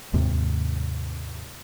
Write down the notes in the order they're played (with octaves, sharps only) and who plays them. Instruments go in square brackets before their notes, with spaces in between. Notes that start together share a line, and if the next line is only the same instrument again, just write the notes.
[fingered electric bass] D#2 G#2 C3